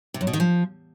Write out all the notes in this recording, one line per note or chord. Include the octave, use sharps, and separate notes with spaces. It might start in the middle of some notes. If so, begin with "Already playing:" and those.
C3
F#2
B2
D#3
F3